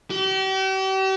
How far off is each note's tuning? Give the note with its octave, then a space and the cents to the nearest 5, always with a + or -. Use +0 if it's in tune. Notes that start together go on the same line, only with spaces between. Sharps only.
G4 -40